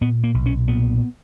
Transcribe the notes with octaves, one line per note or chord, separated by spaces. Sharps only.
A#2 B3
A#3
B1
C#4
A#2 B3